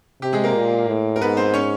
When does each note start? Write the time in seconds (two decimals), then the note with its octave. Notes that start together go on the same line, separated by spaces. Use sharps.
0.22 C3 G4
0.33 G#3 G#4
0.44 A#3 A#4
0.55 A#2
0.88 A2
1.16 A#4
1.21 G#2 B3 B4
1.37 C4 C5
1.54 C#4 C#5